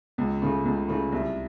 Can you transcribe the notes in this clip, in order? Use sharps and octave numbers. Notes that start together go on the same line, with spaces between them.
C#2
C#3 A3
C#2
C#3 A3
C2